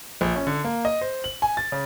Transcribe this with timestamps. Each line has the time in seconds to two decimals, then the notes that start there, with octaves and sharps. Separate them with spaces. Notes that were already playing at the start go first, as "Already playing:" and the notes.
0.21 A#1
0.36 C#4
0.47 D3
0.64 A#3
0.85 D#5
1.01 C5
1.24 F#7
1.42 G#5
1.57 A6
1.72 C#3